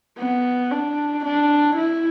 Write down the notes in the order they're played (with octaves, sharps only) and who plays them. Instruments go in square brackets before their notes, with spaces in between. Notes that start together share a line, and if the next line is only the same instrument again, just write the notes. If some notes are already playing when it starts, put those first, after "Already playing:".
[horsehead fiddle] B3
D4
D4
E4